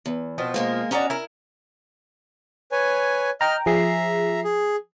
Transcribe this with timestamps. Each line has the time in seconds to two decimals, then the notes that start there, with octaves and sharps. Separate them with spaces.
0.06 E2
0.38 B2 F3 C4
0.54 G#3 A#3 A#4
0.91 C#4 D4 F#4 D#5 A#5
1.10 E4 A#4
2.72 B4 C#5 G#5
3.41 D#5 G5 A#5 F6
3.66 F3 G#4 E5 A#5 C7
4.44 G#4